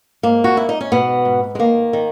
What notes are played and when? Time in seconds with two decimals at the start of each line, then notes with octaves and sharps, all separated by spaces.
0.23 G#2 A#3
0.44 F#4
0.57 G#2 E4
0.69 D#4
0.81 C#4
0.92 G#2 B2 B3
1.25 G#2
1.55 G#3
1.59 D#3 A#3
1.93 D#3